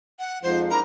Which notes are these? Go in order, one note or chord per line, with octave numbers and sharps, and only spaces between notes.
F#5
F2 G#2 F3 C5
D4 E4 A#4 A#5